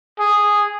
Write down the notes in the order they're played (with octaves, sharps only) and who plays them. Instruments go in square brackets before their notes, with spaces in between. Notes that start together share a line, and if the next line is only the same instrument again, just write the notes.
[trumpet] G#4